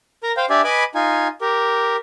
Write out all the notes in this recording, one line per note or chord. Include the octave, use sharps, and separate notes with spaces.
A#4 A#5
C5 F5 G5
D4 G4 D5 E5 G#5
B4 D#5 G#5 B5 D6
D#4 F4 G#5
G4 A#4